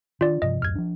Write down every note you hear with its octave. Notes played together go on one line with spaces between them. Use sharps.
D#3 D4 F4 D5
G2 C3 F3 D#5
D1 F#2 F6 G#6
F3 D4